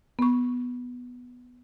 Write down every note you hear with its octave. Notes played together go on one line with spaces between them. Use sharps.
B3 C#6